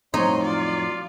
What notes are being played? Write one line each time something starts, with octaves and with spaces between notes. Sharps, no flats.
F2 A2 F#3 D#4 C#5 C6
F4 D5